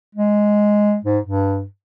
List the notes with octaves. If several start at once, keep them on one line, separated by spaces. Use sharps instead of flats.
G#3
G#2
G2